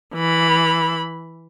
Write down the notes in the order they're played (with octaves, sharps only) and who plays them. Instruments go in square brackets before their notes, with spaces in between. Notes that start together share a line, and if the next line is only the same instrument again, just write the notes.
[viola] E3 B5